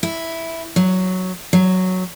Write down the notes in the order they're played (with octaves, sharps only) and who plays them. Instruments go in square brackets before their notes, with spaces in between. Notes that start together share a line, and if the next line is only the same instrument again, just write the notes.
[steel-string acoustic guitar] E4
F#3
F#3